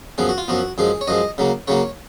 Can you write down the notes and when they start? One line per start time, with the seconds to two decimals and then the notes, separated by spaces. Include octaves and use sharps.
0.18 F#2 F3 B3 G#4
0.29 F#4
0.38 F4
0.48 F#2 F3 B3 F#4
0.78 F#2 F3 G#3 G#4
1.01 C#5
1.07 F#2 F3 G#3 D#5
1.38 C#3 F#3 A#3
1.67 C#3 F#3 A#3 C#5